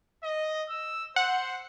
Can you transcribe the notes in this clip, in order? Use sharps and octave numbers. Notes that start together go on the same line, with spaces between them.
D#5
E6
C5 F#5